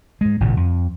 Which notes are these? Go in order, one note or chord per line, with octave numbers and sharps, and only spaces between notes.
G#2 G#3
G#1 A#2 C#3
F2